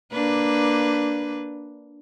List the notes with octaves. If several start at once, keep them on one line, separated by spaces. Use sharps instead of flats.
A#3 D4 B4